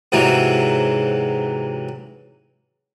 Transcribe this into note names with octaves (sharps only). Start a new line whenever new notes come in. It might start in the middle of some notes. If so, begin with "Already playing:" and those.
G#2 C3 E3 F#3